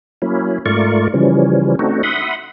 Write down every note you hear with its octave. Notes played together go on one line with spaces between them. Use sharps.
F#3 A#3 C#4 E4
G#2 A3 F4 A#4 D5 C#6
C#3 E3 F3 G3 C#4
A3 C4 D4 D#4 F#4
E5 F#5 B5 C6 D#6